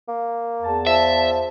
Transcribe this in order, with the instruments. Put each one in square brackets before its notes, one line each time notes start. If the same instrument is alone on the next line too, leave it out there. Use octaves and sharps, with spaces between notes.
[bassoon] A#3
[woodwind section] E2 A5
[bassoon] F3 [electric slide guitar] E5